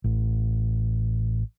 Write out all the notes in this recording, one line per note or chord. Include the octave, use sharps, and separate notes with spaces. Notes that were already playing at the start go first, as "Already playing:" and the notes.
A1